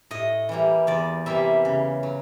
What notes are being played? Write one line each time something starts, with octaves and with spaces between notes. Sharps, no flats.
A2 D#5
E3 G3 A#3
E2 D5
C3 E3 G3 A#3 E5
C#3
F#3